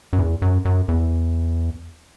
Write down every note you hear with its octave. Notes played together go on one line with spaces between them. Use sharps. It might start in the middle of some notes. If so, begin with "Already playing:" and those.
F#2
E2
F#2
F#2
E2